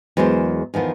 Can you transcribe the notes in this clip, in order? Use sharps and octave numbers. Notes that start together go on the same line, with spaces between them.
E2 F#3 G#3 A#4 C5
E2 D#3 F3 B3